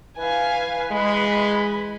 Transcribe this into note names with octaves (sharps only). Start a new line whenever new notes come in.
E3 B4 F5 G#5
G#3 B5